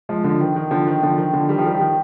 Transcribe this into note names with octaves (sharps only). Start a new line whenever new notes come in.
F3 G#3
D3 F3
D#3
D#3
D3 F3
D#3
D3 F3
D#3
D3 F3
D#3 G3
F3
D#3 G3
F3
D#3